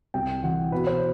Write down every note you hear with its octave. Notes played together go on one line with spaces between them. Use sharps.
C2 G5
E3 F#5
B2 B4
C5